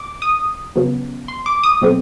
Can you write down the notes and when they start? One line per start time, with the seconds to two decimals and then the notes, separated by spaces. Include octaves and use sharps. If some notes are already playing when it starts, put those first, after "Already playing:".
Already playing: D6
0.22 D#6
0.76 C#3 F#3 B3
1.28 C6
1.46 D6
1.63 D#6
1.81 B2 F#3 A3 C4